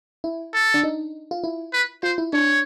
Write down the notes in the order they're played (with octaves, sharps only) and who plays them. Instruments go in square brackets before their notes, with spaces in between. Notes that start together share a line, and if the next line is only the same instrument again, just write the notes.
[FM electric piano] E4
[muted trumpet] A4
[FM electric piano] D4
D#4
F4
E4
[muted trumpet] B4
[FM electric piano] F4 [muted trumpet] C5
[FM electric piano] E4
[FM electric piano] D4 [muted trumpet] C#5